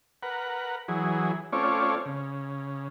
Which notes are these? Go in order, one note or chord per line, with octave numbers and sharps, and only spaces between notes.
A#4 B4 F#5
E3 F#3 G#4
A3 C4 C#4 F4 C#5 D5
C#3